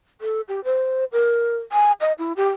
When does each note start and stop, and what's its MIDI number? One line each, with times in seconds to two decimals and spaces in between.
0.21 0.41 69
0.48 0.60 67
0.64 1.05 72
1.12 1.56 70
1.72 1.92 80
2.01 2.13 75
2.19 2.33 64
2.37 2.49 67